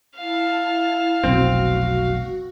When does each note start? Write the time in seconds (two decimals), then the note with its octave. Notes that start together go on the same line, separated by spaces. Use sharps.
0.17 E4 F5 A5
1.23 F1 B1 C4 F#4